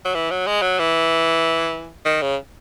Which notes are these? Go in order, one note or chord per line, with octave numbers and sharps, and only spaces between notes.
F#3
E3
F#3
G#3
F#3
E3
D#3
C#3